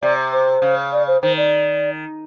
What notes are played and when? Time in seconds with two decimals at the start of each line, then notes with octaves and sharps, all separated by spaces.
0.02 C3 D5
0.32 C5
0.62 C#3
0.92 D5
1.07 C5
1.22 D#3 C5
1.37 D5